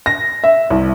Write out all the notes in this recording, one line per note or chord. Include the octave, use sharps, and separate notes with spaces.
A#6
E5
C2